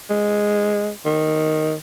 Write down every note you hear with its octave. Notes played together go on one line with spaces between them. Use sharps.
G#3
D#3